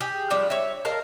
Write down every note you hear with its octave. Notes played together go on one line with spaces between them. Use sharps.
G4 G#4
F3 G3 D4
C#5 E5
A#4 D#5 F5 A5